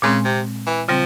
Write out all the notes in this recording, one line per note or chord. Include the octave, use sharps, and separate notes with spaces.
A#2 C#3 G#3 C4
C3
E3
C#3 F3 G3 C4